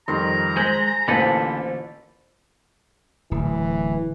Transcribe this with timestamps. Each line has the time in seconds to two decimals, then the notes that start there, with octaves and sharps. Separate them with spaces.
0.08 F2 D#3 G3 A#5 C6
0.57 G#3 C5 G6 B6
1.08 A1 A#2 D3 E3 A4 B4 C5 B5
3.31 D1 E3